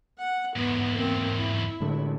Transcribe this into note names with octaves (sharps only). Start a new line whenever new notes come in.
F#5
E2 G#2 B3
A#3 C4
E4
A2 D3 G#3